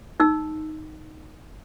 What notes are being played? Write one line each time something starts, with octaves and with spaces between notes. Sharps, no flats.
D#4 E6